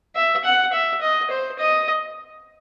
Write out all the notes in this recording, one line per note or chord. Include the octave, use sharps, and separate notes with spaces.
E5
F#5
E5
D#5
C5
D#5